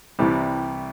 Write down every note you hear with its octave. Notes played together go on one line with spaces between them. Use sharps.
C2 C3 E3 G3